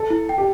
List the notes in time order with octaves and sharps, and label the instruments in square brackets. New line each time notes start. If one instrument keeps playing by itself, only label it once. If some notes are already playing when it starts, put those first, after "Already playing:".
Already playing: [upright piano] A4
[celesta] E4
G5
[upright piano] G4